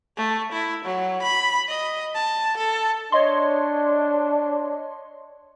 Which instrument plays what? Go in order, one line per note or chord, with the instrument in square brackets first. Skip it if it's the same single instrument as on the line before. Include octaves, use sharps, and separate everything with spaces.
[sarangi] A3
E4
F#3
B5
D#5
A5
A4
[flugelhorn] D4 [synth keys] C#5 D#5 C6